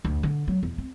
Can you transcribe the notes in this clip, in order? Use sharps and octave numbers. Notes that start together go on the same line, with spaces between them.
D2
D3
F#3
E2
C4